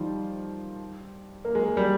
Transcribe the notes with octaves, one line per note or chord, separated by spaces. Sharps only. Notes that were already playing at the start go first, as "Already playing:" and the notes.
Already playing: D#3 F3 G3
A#3
G#3
A#3
G3